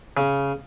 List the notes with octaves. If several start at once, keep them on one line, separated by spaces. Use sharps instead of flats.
C#3